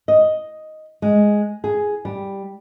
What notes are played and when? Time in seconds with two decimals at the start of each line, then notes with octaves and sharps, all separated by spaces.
0.08 D#5
1.02 G#3
1.64 G#4
2.05 G3